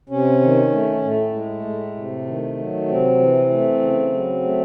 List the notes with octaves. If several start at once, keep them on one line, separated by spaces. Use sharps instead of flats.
C3 C#4
D#3
A3
A2 A3
G#3
A2
C3
D#3
F#3
C3 C4
E3
A3
C#3
F#3
A3